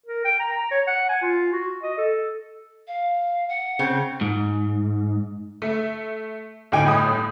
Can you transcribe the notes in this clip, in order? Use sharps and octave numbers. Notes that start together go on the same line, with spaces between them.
A#4
G5
A#5
A#5
C#5
F#5
G#5
F4
F#4
D#5
A4
F5
F#5
C#3 C4
G#2
A3 E5
D2 A2 D#4 G5 G#5 D6
G1 A2 D#6